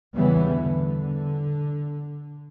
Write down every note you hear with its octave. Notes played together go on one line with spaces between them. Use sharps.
E2 C#3 E3 G3 B3
D3